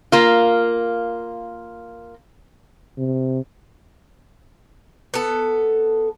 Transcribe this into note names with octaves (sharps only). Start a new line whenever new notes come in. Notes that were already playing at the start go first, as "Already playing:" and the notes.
A#3 F4
C3
B3 A4